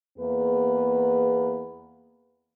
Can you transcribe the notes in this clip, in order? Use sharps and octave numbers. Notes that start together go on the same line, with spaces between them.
E2 A#3 B3 G#4 B4